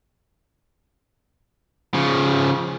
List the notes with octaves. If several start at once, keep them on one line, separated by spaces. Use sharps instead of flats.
C#3 F3